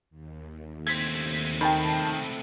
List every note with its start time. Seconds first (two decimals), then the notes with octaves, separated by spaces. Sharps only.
0.10 D#2
0.87 A3 C4 G#6 B6
1.61 D#3 G5 A5 B5